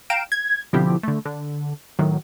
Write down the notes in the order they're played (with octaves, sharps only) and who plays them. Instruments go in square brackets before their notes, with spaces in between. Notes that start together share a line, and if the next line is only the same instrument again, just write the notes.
[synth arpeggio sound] F5 G5 A#5 D7 E7
G#6
B2 D3 F3 C4 E4 G4
D3 A3
D3
A2 D#3 F#3